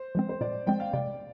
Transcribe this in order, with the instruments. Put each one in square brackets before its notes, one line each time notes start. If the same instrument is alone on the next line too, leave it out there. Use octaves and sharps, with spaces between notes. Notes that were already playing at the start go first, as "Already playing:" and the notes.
Already playing: [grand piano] C5
[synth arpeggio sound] F3 G#3 C4
[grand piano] C5
[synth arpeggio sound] A#2 [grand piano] D5
[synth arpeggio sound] F3 G#3 C4 [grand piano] G5
[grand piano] F5
[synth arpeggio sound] C3 [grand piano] D5